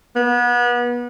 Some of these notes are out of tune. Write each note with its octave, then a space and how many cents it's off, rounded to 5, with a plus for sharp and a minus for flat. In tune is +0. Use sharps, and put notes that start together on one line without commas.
B3 -30